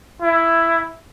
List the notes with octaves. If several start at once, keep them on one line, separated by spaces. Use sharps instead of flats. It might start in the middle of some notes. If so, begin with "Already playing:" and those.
E4